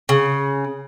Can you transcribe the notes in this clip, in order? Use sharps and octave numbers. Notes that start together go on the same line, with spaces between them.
C#3